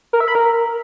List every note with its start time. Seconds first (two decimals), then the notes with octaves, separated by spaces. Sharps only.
0.13 A#4
0.20 E5
0.28 B5
0.35 A#4